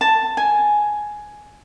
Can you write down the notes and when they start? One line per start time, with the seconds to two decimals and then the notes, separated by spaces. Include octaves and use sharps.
0.01 A5
0.37 G#5